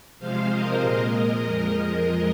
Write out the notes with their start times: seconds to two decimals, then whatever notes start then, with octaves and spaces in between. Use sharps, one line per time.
0.19 C3 F3 G#3 C5 F5
0.50 A#4 D#5
0.81 A#2
0.87 G#3
1.44 F2 F3 G#3